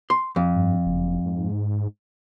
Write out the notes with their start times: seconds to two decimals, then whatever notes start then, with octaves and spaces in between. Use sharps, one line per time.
0.10 C6
0.36 F2
0.55 G2
0.86 F#1
1.25 G#2